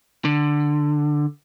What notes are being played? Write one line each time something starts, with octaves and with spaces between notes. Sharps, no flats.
D3